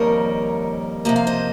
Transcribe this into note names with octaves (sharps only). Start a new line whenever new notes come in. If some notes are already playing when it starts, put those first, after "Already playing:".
Already playing: F2 D#3 G3 A#3 A#4 C#5
C3 F3 A#3 D#5
F5
C5 D#5